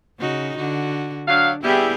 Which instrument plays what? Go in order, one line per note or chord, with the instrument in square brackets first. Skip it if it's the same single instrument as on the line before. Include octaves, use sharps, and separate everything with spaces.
[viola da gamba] C#3 D#4 F#4
D3 F#4
[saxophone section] F#3 F5 [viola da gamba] D4
[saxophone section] G3 E4 [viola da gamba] B3 G4 G#4